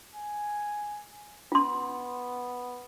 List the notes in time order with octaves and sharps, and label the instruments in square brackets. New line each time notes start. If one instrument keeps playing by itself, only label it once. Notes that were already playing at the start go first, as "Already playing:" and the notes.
[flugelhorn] G#5
[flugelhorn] B3 [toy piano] F4 C6